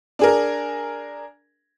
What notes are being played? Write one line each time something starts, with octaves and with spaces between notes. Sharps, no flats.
D4 G#4 A#4